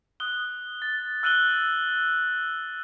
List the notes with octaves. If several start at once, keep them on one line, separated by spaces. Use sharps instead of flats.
D#6 F#6 G7
A6
E6 F#6 D#7 F#7 G7